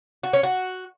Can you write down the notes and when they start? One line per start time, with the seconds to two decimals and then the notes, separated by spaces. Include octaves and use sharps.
0.23 F#4
0.33 C#4
0.43 F#4